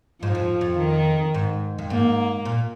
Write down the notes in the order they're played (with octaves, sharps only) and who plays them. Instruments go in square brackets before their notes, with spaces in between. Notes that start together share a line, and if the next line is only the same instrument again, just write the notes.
[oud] G#2 [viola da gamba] F3
[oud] F2
F2
[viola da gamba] D#3
[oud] G#2
F2
[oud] G#2 [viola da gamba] A#3
[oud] A#2